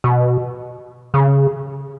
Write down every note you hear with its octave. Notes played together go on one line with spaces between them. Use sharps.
B2
C#3